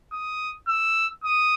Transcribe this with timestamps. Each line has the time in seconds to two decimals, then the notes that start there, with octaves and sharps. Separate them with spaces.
0.12 D#6
0.68 E6
1.24 D#6